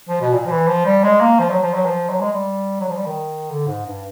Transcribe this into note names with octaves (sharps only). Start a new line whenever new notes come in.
F3
B2
A#2
F3
E3
F3
G3
G#3
A#3
F3
F#3
F3
F#3
F3
F#3
G#3
G3
F#3
F3
G3
D#3
D3
G#2
G2